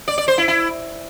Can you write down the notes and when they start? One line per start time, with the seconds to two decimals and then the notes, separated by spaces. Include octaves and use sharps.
0.08 D5
0.18 D5
0.28 C5
0.38 E4
0.48 E4